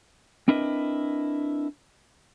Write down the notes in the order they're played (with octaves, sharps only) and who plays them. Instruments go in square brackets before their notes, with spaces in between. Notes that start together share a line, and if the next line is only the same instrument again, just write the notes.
[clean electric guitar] C4 D4 E4 A#4 B4 D#5